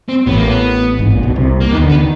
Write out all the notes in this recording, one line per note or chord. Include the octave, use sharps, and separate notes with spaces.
C4
A1 A2 B3
A#3
B3
G#1 G#2
A#1 A#2
B1 B2
C2 C3
A#3
D#2 D#3 B3
D2 D3
B3
D#3